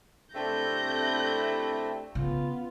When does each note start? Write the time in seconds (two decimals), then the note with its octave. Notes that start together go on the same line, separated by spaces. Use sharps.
0.35 C3 A3 C4 D4 E4 G6 A#6
2.15 C#3 B3 F4